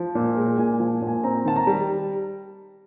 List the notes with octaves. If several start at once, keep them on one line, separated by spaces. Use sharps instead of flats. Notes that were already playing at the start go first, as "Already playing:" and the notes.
Already playing: F3
A#2
G#3
A#2 G#5
F3
A#2
G#5
C4 A#5
D#3 A5
A#5
G3